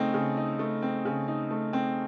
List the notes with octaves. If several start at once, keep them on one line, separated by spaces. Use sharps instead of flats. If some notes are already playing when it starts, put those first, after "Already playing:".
Already playing: C#3 A3 C4 D#4
C#3
D#4
A3
C4
C#3
D#4
A3
C4